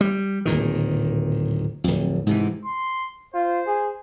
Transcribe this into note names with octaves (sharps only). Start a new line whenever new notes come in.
G3
D1 A#2 D#3
D1 F2
G#2 C3 E3
C6
F4 C5
G#4